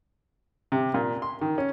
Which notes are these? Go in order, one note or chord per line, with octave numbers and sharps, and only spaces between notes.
C3
A#2
C6
D#3
C#4